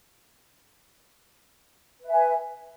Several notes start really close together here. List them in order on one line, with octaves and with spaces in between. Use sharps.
B4 E5 G#5